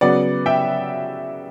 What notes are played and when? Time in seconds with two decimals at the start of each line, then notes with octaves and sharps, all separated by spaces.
0.01 C#3 F#3 B3 D5 F#5
0.46 E5 G5